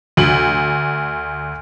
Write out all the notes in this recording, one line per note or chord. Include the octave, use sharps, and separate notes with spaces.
D2 F#7